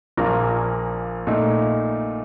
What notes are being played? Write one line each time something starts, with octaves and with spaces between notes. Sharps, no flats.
A#1 A#2 F3 A#3
A#2 A3 D#4